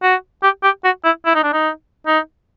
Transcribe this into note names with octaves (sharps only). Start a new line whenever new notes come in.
F#4
G4
G4
F#4
E4
E4
D#4
D4
D#4
D#4